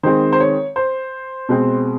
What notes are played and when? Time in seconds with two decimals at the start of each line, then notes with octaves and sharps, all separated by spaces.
0.03 D#3 G#3 C4 C5
0.33 C5
0.40 C#5
0.76 C5
1.49 B2 G#3 C4